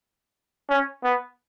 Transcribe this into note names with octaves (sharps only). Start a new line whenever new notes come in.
C#4
B3